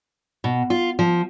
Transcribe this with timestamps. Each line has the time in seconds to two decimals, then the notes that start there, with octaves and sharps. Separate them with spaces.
0.44 B2
0.70 F4
0.99 F3